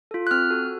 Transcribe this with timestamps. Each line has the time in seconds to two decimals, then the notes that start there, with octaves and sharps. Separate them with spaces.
0.11 F4 A4
0.27 F#6
0.31 C4 F6
0.51 F#4 A4